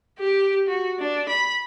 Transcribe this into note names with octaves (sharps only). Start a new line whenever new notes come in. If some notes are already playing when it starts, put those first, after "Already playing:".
G4
F#4
D4
B5